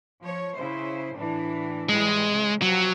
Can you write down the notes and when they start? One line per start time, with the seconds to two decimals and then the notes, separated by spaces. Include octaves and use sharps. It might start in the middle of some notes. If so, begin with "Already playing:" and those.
0.21 F3 C#5
0.56 C#3 E4 C5
1.16 A2 E3 D4
1.89 A2 E3 G3 G#3
2.29 C#3
2.62 C3 F3 F#3